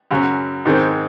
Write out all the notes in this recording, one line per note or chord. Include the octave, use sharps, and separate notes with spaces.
F#2 C#3 F#3
G#2 D#3 G#3 C4